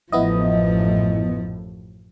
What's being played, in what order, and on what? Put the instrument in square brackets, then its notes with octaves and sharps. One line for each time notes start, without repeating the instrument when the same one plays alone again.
[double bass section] A1 F#2 A2 [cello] F3 [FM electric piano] B3 E4 D#5